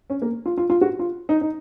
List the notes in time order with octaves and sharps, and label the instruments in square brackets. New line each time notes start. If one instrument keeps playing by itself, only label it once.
[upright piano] C#4
A#3
F4
F4
F4
F#4
F4
D#4
D#4